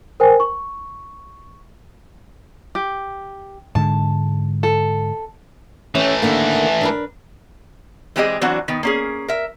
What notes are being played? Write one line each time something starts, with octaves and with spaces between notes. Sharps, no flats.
A#4 C5 G5 G#5
C#6
G4
G#2 D3 G#3 A5
A4
E3 A3 C#4 G4
D3 D#3 A#3
D4 A#4 B4
E3 G#3 C4 G4 G#4 D#5
E3 F#3 C4 D4 F#4
D#3 B3
A#3 C#4 G#4
A#4 E5